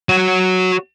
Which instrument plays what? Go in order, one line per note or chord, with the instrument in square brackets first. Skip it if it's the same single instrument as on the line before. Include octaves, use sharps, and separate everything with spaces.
[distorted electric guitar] F#4 C#5